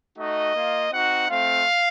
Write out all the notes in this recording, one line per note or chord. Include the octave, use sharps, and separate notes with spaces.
A3 D#4 F#4 D#5
A#3 F4
C4 D#4 F#4 F#5
A3 C4 F4 F5